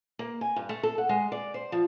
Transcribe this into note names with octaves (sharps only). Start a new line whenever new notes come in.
A#3
G#5
G2
A3
A4
F#5
G#3
D5
C5
F3